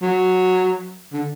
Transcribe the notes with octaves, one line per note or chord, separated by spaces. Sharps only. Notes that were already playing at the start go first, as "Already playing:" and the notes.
F#3
D3